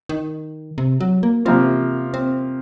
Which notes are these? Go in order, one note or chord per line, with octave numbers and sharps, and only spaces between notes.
D#3
C3
F#3
A#3
C3 F3 A#3 C4 F4
C4